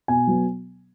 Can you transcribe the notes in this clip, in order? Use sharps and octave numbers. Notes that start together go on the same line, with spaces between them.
B2 G#5
F#3 B3